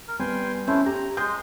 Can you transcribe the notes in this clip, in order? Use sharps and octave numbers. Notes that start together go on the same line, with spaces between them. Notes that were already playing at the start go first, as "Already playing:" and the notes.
A#4
G3 B3 G5 G#5 C6
A3 C#4 E4 C5
G4 A#5
G#3 D#5 C6 G6